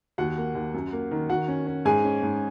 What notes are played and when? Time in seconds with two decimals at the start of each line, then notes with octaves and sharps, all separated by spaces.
0.18 D#2 F#4 F#5
0.38 A#3
0.55 D#2
0.74 F#2
0.92 A#3
1.11 D#3
1.29 D#3 F#4 F#5
1.48 C#4
1.67 C#4
1.85 G#2 G#4 G#5
2.04 C#4
2.23 G#2